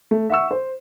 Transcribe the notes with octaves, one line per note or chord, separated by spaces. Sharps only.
A3
E5 F#5 C#6 E6
C5